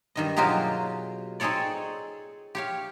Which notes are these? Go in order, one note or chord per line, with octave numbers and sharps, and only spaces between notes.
G2 D#3 D#5
B2 F#3 F4 G4 G#4 A#5
C4 D#4 G#4 A4 C#5 D5
G4 C#5 F5